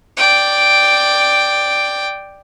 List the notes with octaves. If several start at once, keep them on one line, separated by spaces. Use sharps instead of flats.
D5 G5